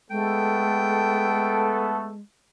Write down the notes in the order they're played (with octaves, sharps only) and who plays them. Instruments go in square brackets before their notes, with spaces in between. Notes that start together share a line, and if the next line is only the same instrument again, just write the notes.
[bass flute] G#3 [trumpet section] A3 B3 A4 [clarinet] G5